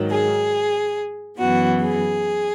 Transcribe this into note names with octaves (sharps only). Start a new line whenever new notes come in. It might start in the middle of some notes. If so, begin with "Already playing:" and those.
Already playing: G#2 D#3 F#3
G#4
F#2 E3 B3 F#4
G#4